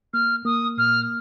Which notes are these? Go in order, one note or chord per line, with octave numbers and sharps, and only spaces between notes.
A#3 F6
A#3 D#6
A#2 F6